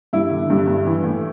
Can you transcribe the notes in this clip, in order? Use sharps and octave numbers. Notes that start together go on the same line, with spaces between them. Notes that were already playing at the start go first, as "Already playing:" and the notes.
G2 E4
D3
G2
G2
E3
A2